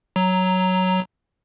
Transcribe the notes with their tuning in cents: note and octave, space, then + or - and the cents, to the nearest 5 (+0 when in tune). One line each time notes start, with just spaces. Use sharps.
F#3 +0 A#5 +0